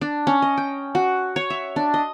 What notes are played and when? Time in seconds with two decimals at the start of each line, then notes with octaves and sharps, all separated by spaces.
0.01 D4
0.27 C#4
0.42 D#5
0.57 G5
0.95 F#4
1.36 C#5
1.50 E5
1.76 D4
1.94 D#5